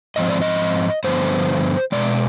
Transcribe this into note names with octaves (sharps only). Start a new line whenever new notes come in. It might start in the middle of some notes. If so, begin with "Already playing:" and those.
G#2 F3 C4 D#5
D5
D#5
G2 D3 F3 B3 C5
B2 G#3 D5